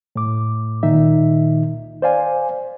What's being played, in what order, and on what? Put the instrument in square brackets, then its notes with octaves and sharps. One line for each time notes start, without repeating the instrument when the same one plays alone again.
[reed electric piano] A2 D6
C#2 A#2 D#3 D#4 E5
C5 D5 F5 G#5